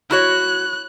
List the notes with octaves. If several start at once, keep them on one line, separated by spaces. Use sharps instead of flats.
E4 F#4 C#5 F#6